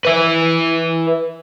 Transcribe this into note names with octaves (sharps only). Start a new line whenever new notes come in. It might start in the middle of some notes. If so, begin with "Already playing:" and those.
B4 E5